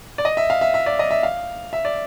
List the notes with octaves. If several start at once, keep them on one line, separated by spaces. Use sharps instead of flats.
D5
D#5
E5
F5
E5
E5
D5
D#5
E5
F5
E5
D5